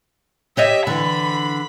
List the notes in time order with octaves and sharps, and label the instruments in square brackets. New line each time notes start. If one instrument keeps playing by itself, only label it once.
[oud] G4 C#5 D#5 [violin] E5
[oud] D3 E3 [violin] B5